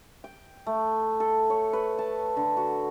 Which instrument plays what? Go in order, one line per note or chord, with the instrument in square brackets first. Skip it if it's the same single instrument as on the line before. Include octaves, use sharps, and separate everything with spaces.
[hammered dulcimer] G5
A3
A4
C#5
B4
A5
D3
F#4